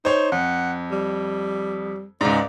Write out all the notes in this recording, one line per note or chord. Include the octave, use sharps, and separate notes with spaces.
D#4 C5 C#5 C6
F2 F#5
G3
C#2 G#2 D5